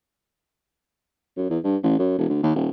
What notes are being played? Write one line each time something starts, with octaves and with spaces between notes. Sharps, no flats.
F#2
E2
G2
A1
F#2
E1
D2
D#2
D#1